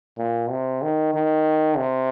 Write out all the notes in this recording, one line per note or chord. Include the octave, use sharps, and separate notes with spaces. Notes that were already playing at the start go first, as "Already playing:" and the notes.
A#2
C3
D#3
D#3
C3